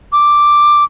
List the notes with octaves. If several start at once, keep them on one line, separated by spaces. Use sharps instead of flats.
D6